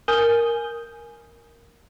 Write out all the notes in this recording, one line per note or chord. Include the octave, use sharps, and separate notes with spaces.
A#4 G#5 D#6 G6